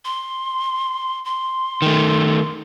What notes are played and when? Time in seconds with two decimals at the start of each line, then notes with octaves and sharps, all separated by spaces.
0.05 C6
1.25 C6
1.82 D#3 A3